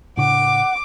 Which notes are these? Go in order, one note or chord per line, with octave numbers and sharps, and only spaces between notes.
A2 C#3 D4 F#5 D6